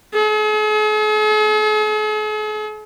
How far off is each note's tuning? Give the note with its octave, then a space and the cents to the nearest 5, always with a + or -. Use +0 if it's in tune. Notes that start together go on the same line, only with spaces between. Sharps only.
G#4 +45